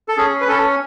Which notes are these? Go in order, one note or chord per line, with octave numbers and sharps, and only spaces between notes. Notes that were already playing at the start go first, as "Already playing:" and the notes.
A4
C#4 G#4
B4
C#4 A4